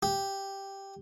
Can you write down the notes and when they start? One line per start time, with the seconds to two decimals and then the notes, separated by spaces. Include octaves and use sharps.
0.03 G4